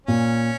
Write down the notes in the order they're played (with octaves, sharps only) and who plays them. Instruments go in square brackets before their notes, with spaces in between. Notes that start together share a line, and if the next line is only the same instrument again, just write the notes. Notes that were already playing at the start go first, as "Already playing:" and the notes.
[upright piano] A#2 [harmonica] C#4